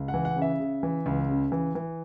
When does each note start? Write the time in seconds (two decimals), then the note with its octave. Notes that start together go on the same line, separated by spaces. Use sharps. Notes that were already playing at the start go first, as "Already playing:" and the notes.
Already playing: C#2
0.08 F#5
0.14 E3
0.25 F#5
0.36 C#3
0.42 E5
0.60 C#3
0.83 E3
1.06 C#2
1.29 C#3
1.52 E3
1.75 E3